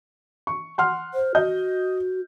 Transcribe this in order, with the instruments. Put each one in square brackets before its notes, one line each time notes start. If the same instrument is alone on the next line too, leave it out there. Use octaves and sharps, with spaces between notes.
[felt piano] C#6
F#5 C6 F6
[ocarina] C5
[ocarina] F#4 [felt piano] D#5 G6